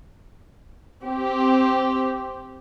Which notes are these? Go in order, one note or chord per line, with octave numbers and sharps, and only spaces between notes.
C4 G4